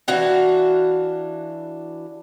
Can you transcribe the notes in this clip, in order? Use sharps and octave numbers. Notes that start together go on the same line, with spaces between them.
E3 D4 F#4 F5